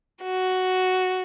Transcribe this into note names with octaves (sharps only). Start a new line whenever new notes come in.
F#4